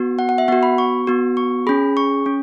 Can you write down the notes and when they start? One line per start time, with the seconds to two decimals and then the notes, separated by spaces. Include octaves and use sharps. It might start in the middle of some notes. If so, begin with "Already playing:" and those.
Already playing: B3 F#4
0.19 F#5
0.29 F#5
0.38 E5
0.48 B3 F#4 F#5
0.63 B5
0.78 C#6
1.07 B3 F#4
1.37 C#6
1.67 C#4 G#4 B5
1.97 C#6
2.26 C#4